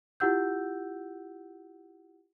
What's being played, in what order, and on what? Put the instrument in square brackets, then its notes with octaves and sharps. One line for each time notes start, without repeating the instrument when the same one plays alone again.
[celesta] E4 F4 G4 F#5 E6 G6